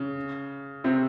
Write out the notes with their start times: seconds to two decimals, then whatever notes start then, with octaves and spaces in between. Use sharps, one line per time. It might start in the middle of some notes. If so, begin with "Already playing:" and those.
Already playing: C#3
0.84 C3 C4